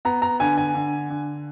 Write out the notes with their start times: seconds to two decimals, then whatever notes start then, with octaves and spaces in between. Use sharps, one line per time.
0.05 B3 A#5
0.22 A#5
0.40 D3 G#5
0.58 G#5
0.75 D3
1.10 D3